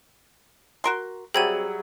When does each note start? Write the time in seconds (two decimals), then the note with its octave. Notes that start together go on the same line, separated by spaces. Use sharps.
0.84 F#4 A#4 C6
1.34 F#3 G3 C4 G#4 E5 G#6 D#7